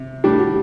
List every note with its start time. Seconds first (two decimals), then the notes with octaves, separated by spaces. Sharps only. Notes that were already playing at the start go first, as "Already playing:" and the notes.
Already playing: C3
0.24 A2 G3 D4 G4
0.39 F#4